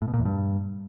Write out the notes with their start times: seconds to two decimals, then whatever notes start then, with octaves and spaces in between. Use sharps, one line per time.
0.02 A2
0.08 B2
0.14 A#2
0.20 E2
0.25 G2